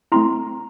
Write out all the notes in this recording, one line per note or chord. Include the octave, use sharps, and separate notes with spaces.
A3 C4 E4 A#5 C6